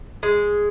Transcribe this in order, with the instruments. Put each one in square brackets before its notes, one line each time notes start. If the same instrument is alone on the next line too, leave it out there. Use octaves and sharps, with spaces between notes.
[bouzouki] G#3